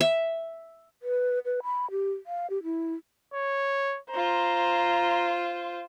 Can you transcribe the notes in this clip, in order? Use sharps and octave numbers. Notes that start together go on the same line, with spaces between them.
E5
B4
B4
B5
G4
F5
G4
E4
C#5
F4 C5 A#5